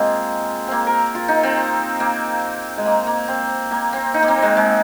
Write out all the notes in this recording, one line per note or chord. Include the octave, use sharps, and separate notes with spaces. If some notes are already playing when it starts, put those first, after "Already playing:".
Already playing: G#3 A#3 C4 F4 G#4
A#3 C4
A#4
F4
D#4
C4
A#3
G#3
A#3
A#3
C4
A#3
C4
D#4
A#3
C4
G#3
G#3